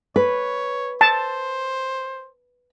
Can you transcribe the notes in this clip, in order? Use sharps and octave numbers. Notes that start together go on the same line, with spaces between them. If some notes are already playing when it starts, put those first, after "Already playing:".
B4 C#5
C5 A5